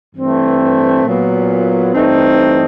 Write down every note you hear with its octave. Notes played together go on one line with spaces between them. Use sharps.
G2 E3 A3 C4
A#2 F#3 B3
G2 E3 A3 C4 D#4